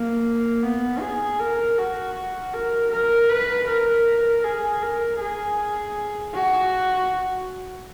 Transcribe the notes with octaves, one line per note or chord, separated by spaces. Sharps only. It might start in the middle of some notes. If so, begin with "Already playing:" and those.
Already playing: A#3
B3
G#4
A#4
F#4
A#4
A#4
B4
A#4
G#4
A#4
G#4
F#4